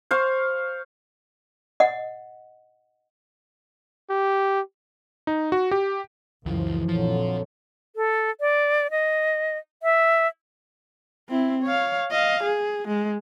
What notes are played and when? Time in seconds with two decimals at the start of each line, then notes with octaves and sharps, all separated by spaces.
0.11 C5 F5 C#6
1.80 D#5 F#5
4.10 G4
5.27 D#4
5.52 F#4
5.71 G4
6.46 C#2 F#2 E3 F3
6.88 A#1 F2 D3 F3 F#3
7.96 A4
8.40 D5
8.91 D#5
9.83 E5
11.29 C4 E4
11.63 C#5 F5
12.11 D#5 F5
12.43 G#4
12.88 G#3